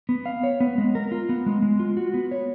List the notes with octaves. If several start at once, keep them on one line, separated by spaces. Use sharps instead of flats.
B3
F5
C#5
B3
G#3
A#4
F4
B3
G#3
G#3
F4
F#4
B3
C#5